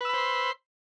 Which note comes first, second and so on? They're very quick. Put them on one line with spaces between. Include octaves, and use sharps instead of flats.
B4 E6 B5 C5 C6